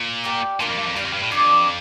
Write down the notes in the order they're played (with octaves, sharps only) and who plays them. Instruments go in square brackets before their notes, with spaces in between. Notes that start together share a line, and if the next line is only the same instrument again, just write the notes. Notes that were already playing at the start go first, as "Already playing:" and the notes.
Already playing: [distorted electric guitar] A#2
[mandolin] G4 A#4 D5
[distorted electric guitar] A#2 [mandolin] A#3 D4 F4 A#4
[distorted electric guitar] F2
G2
F2
[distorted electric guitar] G2 [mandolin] G4 D5 F5
[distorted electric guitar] F2
G2
A2
[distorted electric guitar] F2 [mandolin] D4 G4 D5